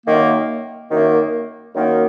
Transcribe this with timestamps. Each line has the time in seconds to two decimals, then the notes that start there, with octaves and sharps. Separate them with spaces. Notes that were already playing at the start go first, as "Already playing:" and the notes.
0.05 F#2 D#3 A#3
0.90 F#2 D#3 A#3
1.74 F#2 D#3 A#3